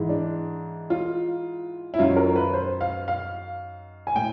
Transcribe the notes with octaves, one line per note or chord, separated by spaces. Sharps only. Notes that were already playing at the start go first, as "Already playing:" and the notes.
Already playing: G#2 E3
D4
F4
E4
F#2 D#3 F#3 F4
A#4
B4
C5
F5
F5
G#5
A2 G5